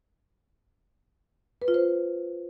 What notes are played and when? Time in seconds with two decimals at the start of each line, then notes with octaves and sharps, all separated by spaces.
1.62 B4
1.68 F4
1.74 C5